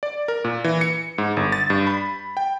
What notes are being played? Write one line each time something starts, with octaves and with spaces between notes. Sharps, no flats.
D5
A#4
A#2
E3
C#7
G#2
G1
A6
G2
B5
G5